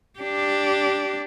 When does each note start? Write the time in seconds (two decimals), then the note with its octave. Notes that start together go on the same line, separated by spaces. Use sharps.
0.19 D4 G4